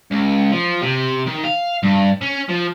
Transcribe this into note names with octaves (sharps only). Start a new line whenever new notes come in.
C#2
F3
C3
D#3
F5
G2
C#4
F3